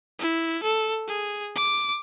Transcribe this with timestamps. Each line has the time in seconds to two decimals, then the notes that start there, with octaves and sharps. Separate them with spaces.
0.19 E4
0.63 A4
1.08 G#4
1.56 D6